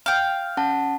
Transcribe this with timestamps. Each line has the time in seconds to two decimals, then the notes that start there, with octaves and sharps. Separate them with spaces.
0.06 F5 G5
0.57 C#4 F#5 A5